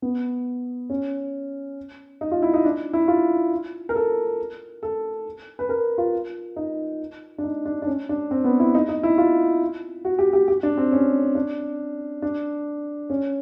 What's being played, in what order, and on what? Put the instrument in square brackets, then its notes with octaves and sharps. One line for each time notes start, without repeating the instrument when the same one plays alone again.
[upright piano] B3
C#4
D#4
F4
E4
D#4
D4
E4
F4
A#4
A4
A4
B4
A#4
F4
D#4
D4
D#4
D4
D4
C#4
D4
C4
B3
E4
D#4
D#4
E4
F4
F#4
G4
G4
G4
D4
C4
C#4
D4
D4
C#4